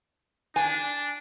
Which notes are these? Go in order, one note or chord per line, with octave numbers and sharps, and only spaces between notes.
D4 G#5